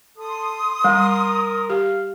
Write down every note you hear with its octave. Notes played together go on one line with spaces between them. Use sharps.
A4 C6 D#6
G3 A#4
G4 F5